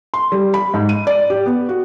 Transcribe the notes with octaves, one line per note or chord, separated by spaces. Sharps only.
C6
G3
B5
G#2
D#7
D5
G4
B3
F#4